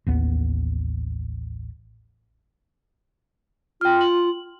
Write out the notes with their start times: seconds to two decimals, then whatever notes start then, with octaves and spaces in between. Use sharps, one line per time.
0.07 A1 D#2 B3
3.81 F4 G5 F6
4.01 F#7